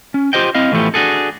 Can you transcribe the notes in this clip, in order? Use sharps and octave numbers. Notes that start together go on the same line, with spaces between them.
C#4
F4 G4 C5 D#5 G5
C4 E4 D#5 F5
A2 E3 F3 A3 B3 G4
D4 F#4 G#4 A4